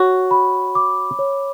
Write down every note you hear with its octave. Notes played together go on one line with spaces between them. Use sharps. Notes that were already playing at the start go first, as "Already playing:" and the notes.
Already playing: F#4 C#5
B5
D6
C#5